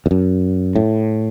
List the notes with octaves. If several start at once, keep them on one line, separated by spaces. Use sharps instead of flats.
E2
F#2
A2